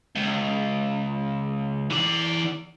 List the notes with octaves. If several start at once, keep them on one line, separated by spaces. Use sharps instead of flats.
C#2
E3 D5